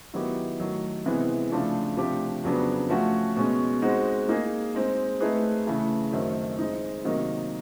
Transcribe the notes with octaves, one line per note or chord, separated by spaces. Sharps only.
D#3 F#3 B3 E4 G4
D#3 F#3 A3
C3 E3 G#3 B3 E4
C#3 F3 A3 D4 F4
C3 F3 A3 D4 G4
F2 C#3 F#3 B3 D4
F3 A3 C#4 F#4
B2 G#3 C#4
G#3 C4 D#4 F#4
A#3 D#4 G#4
G#3 C4 D#4
A3 C4 D#4 G#4 B4
C#3 E3 A3
F#2 D#3 F#3 A3 C4
G#3 C4 D#4
C3 D#3 F#3 A#3 D#4